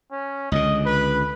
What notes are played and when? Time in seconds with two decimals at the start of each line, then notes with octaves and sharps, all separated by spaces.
0.11 C#4
0.52 C#2 D3 D#5
0.86 B4